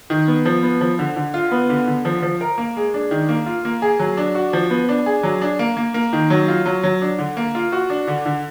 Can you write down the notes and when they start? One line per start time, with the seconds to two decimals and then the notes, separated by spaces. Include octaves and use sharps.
0.10 D#3
0.28 B3
0.45 F3
0.63 B3
0.81 F3
0.99 D3
1.16 D3
1.34 F4
1.52 B3
1.69 D3
1.87 D3
2.05 F3
2.22 F3
2.41 A#4
2.58 A#3
2.76 G#3
2.94 D4
3.11 D#3
3.29 A#3
3.46 F4
3.65 A#3
3.82 G#4
3.99 F#3
4.17 D4
4.35 F#4
4.53 F3
4.70 B3
4.89 D4
5.06 G#4
5.23 F#3
5.42 D4
5.59 A#3
5.77 A#3
5.94 A#3
6.13 D#3
6.30 F#3
6.48 F4
6.66 F#3
6.83 F#3
7.02 D4
7.19 D3
7.37 A#3
7.55 F4
7.72 F#4
7.90 D4
8.07 D3
8.26 D3